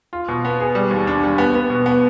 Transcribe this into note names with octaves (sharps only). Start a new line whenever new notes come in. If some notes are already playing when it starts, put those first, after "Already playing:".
F4
B2
B3
G#4
G3
D#2
D4
G3
B3
B3
B2
B3